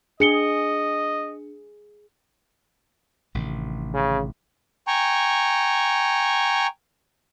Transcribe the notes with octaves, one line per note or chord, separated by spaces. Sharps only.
D4 G#4 D#5 C#7 G7
A1 C3 D#3
C#3
G5 G#5 A#5 C#6